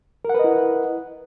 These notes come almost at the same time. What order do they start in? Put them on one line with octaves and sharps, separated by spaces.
A#4 F#5 B4 D#5 E4